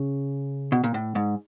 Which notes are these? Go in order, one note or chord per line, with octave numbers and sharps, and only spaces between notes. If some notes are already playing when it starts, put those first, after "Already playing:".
Already playing: C#3
B2
A#2
A2
G#2